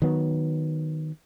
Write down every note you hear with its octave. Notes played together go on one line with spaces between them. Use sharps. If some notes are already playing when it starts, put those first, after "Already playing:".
D#3 F#3 B3